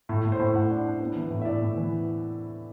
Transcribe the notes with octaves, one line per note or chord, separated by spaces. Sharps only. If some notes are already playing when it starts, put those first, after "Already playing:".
A2
A2
C5
A2
A2 F#5
D4
D4
B3
E3
A2
E5
A2 D5
A2
E3